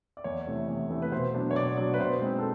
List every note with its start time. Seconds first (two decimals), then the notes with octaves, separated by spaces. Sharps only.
0.17 D5
0.24 E2 C#5
0.47 C3 E3 A3
0.68 E2
0.90 C3 E3 A3
1.02 B4
1.12 B2 C5
1.34 F#3 B3 D4
1.51 C#5
1.55 B2 D5
1.77 F#3 B3 D4 D5
1.94 B4
2.00 B2 C5
2.21 G#3 C4 D#4
2.39 A4